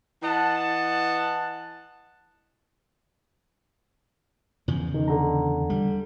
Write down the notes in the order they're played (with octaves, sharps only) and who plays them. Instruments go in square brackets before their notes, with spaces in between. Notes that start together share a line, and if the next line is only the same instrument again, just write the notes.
[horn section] E3 D#5 F#5 A5
[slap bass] E2 C#3 F3
[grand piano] D#3
D3 A#5
[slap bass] G3